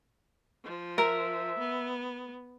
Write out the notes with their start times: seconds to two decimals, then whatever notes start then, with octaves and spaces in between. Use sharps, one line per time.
0.64 F3
0.98 A#4 E5
1.59 B3